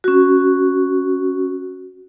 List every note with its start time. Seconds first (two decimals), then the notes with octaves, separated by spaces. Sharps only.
0.04 C#4 F#4